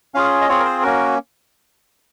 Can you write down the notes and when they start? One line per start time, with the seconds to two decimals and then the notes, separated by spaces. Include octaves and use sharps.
0.14 C#4 F4 G#4 F5
0.41 D#5
0.49 C4 F4 G#4 C#5
0.60 A#4
0.65 C5
0.83 A#3 C#4 F#4 A#4